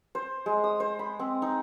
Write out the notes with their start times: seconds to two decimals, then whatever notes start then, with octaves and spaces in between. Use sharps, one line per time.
0.15 C5
0.46 G#3
0.64 D#6
0.80 C5
0.99 B5
1.19 C4
1.42 D#4